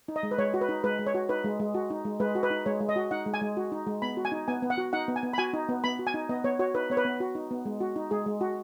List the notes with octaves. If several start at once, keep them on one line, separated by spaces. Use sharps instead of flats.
D#4
D#5
G#3
B4
G#3 C#5
F#4
B4
D#4
G#3 B4
G#3
C#5
F#4
D#4 B4
G#3
G#3
F#4
D#4
G#3
G#3 B4
F#4
B4
D#4
G#3 C#5
G#3
D#5
F#4
D#4 F#5
G#3
G#5
G#3
F#4
D#4
G#3
B3 B5
F#4
G#5
D#4
B3 G#5
B3
F#5
F#4
D#4 F#5
B3
G#5
B3
B5
F#4 G#5
D#4
B3
B3 B5
F#4
G#5
D#4
B3 D#5
B3 C#5
F#4 C#5
D#4 B4
B3 C#5
B4
B3
F#4
D#4
B3
G#3
F#4
D#4
G#3 G#4
G#3
F#4